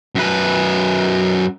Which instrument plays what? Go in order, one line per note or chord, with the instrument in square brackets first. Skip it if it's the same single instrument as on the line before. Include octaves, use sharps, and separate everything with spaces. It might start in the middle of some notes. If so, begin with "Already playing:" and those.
[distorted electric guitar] F#2 B4